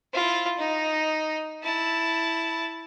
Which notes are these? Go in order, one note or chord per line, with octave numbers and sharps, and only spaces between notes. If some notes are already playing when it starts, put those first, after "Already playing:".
E4 F4
D#4
E4 A5